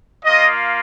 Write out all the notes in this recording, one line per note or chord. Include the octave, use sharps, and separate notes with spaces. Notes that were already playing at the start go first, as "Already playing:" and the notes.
A#3 F4 D#5